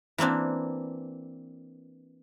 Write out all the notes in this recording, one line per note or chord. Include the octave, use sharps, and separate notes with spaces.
E3 A#3 C4 D4